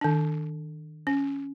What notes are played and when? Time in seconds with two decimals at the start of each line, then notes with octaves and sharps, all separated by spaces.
0.01 D#3 D4
1.07 C#4